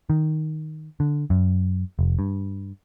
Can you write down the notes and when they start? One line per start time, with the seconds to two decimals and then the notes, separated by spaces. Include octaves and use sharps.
0.10 D#3
1.00 D3
1.30 F#2
1.99 F1
2.19 G2